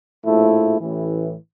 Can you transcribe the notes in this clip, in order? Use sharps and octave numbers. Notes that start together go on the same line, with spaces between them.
A#1 A2 F3 A3 E4
A1 A2 E3